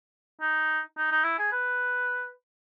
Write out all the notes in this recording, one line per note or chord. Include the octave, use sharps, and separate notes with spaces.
D#4
D#4
D#4
E4
G#4
B4